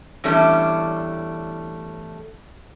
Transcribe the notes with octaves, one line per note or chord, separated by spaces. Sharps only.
E2 A2 G3 A3 C#4 D4